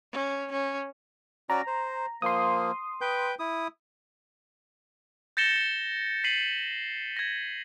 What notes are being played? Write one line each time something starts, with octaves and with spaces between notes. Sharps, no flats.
C#4
C#4
C#4 F#4 D5 A#5
C5
F3 A#3 C6 D#6
B4 G5 G6
E4 D#6
G6 A6 A#6 C#7 E7 G7
B6 C7 D#7 F#7
G#6 A#6